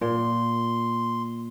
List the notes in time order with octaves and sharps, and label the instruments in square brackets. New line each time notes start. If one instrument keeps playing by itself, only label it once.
[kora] A#2 [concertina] C6